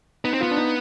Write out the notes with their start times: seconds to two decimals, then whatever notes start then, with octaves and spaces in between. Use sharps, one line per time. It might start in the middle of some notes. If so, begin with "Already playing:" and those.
0.24 B3 D#4
0.34 C4
0.41 B3 F4
0.51 D4
0.57 D#4